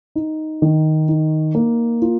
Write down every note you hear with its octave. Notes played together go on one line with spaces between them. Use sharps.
D#4
D#3
D#4
A#3
F4